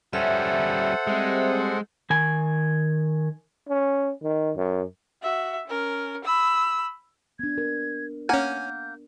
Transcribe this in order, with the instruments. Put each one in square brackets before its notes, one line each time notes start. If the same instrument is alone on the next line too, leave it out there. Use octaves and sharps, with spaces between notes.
[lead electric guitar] G3 C#4 [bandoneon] A4 C5 F#5 [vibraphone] E5
[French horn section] G3 C4 [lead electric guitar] G#3
[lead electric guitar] D#3 G#5
[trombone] C#4
D#3
F#2
[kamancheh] F#4 E5
C#4 A#4
B5 E6
[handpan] B3 D4 [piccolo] G#6
[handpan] A#4
[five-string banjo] A#3 F#5 [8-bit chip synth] C#4 G#5 [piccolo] G6